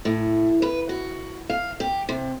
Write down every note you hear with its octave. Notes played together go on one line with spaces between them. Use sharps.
A2
B4
F#4
F5
G4
C3